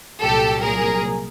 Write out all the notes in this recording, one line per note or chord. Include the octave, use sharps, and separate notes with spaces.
C2 A#2 F#3 G4 A4
G#4 A#4